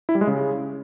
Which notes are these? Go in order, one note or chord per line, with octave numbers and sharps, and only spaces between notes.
E4
G3
G#3
C#3